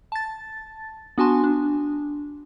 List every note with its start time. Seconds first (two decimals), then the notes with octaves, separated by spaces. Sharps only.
0.12 A5 A6
1.18 B3 D4 F#4 G#5 A5 C6
1.44 D4